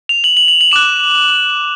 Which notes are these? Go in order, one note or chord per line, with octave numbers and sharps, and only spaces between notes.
F7
F#7
F#7
F#7
F#7
D6 F#6 E7